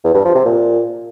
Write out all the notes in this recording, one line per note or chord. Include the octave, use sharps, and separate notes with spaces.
E2
G2
F3
C3
A#2